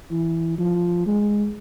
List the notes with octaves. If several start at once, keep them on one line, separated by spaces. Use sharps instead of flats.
E3
F3
G#3